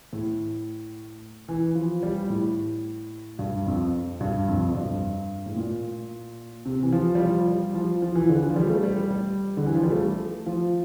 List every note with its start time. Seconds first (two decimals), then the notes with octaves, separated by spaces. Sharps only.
0.13 A2
1.48 E3
1.75 F3
2.03 G3
2.30 A2
3.39 G2
3.67 F2
4.21 G2
4.48 F2
4.69 F2
4.75 G2
5.46 A2
5.56 A#2
6.65 C3
6.83 E3
6.93 F3
7.15 G3
7.20 F3
7.48 G3
7.74 F3
8.02 F3
8.15 E3
8.29 D3
8.42 E3
8.50 F3
8.56 G3
8.70 A3
8.83 G3
9.11 G3
9.57 D3
9.66 E3
9.75 F3
9.83 G3
9.92 A3
10.46 F3